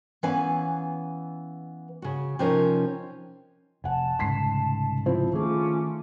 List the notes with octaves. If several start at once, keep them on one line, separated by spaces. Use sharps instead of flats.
E3 B3 C#4 B4 F5 G#5
C#3 F#4
C3 F3 C#4 D#4 F4 A#4
F1 F#5 G#5 A5
C2 G#2 C#3 C6 B6 C7
F3 C4 E4
D#3 A3 C#4 F4 G#4 D6